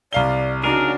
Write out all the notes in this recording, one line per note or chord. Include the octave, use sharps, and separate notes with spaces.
C2 D5 F5 G7
C#3 D4 D#4 F#4 G#4 A#4